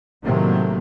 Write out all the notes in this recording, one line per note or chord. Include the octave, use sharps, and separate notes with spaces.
A2 C3 D#3 F#3 A3 A#3